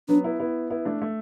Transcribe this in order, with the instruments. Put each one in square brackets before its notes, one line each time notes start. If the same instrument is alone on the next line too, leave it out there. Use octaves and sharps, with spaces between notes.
[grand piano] F#3 B3 [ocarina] D4
[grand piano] B3 E4
B3 E4
B3 E4
A3 D4
A3